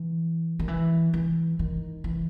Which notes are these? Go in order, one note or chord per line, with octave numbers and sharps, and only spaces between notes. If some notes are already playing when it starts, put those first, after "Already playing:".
Already playing: E3
D#3
E3
E3
D#3
E3